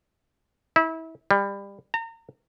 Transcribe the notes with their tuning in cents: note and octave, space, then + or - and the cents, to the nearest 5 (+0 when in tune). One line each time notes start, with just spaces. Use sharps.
E4 -30
G3 +25
A#5 -35